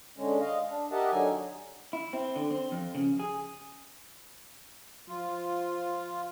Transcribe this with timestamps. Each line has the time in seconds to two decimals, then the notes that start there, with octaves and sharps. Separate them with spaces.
0.18 D3 G#3 C#4
0.41 D#5 F5
0.70 D4
0.92 G4 A#4 D#5 E5 F#5 A5
1.11 D3 F#3 D#4 G#5
1.93 E4
2.13 C4
2.36 D3
2.51 C4
2.72 F2
2.95 C#3
3.20 G#4
5.09 F3 F4